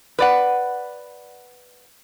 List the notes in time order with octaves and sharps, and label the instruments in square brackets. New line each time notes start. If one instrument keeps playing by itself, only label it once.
[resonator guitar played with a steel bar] B4 D5 F#5